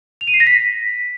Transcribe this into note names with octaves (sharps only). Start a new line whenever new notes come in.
F7
D#7
C7
A#6
B6